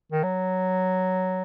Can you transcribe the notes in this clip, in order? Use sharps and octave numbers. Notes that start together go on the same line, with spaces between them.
D#3
F#3